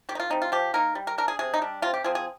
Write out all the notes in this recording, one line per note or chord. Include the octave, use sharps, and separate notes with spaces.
D#3 G4
D#4
F4
G3 C4 D#4
F4
F3 G4
A#3 D#4 A#4
G3
A#4
D4 A#4
G#4
C3 G#4
D#4
G3 D4
C3 F4
G4
F3 C4 G#4
G#4